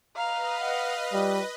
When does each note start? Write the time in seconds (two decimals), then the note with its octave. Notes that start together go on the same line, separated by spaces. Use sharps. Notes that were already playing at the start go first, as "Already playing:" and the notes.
0.16 B4 D#5 F5 A#5
0.59 F#5
1.13 G3 F4